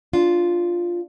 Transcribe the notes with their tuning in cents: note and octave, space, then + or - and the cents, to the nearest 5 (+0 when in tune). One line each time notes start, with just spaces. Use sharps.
D4 +0 F4 +0